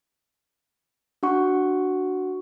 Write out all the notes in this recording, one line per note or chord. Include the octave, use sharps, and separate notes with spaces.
D4 F#4 F#5 C#6